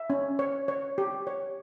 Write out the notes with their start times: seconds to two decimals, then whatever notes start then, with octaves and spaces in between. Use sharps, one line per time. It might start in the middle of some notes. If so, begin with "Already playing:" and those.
Already playing: E5
0.10 C#4
0.39 C#5
0.68 C#5
0.98 G4
1.27 C#5